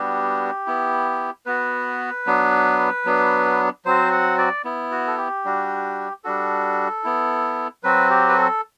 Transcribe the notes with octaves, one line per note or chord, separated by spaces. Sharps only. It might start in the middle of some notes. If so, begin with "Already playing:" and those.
Already playing: G3 B3 D4 F#4 G4
B3 E4
B3 F#4 B4
F#3 B3 D4
F#3 B3 D4
F#3 C4 F#4 C5
F#5
D5
B3 E4
F#4
A4
G4
G3 D4 F#4
G3 D4 F#4 A4
B3 E4
F#3 C4 F#4 B4
G4
B4
A4